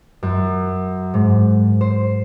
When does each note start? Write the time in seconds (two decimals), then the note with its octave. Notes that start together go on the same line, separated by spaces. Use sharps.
0.23 F#2
1.14 G#2
1.81 C5